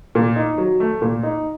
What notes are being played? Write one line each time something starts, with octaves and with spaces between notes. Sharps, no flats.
A#2
D#4
F#3
A3
A#2
D#4